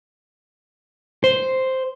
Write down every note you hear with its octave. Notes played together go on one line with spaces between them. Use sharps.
C5